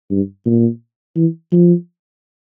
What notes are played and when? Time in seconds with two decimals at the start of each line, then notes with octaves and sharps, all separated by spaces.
0.11 G2
0.46 A#2
1.16 E3
1.52 F3